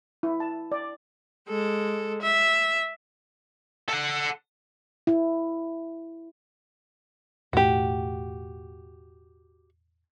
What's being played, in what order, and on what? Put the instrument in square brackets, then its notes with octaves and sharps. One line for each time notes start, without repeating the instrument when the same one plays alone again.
[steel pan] E4
A5
D5
[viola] G#3 A4
E5
[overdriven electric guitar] A4 F#5
[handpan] E4
[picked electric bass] E1 A2 [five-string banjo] F#4 G4